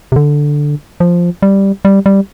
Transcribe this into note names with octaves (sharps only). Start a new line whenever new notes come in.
C3
D3
F3
G3
G3
G3